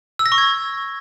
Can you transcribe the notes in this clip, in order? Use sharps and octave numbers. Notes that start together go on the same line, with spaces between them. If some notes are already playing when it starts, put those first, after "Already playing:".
E6
A#6
C#6
G#6